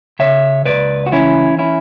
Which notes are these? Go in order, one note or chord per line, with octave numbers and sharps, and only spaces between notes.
C#3 C#5 E5
C#2 B4 D5
F#4
E3 C#4 E4
C#4 E4